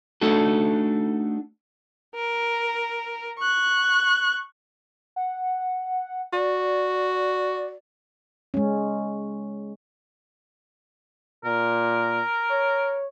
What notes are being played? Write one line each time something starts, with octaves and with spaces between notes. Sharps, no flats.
A3 D4 D#4 F#4 A4
A#4
C#6 F#6
F#5
F#4 D5
G#3 C#4
A#2 A#4
C#5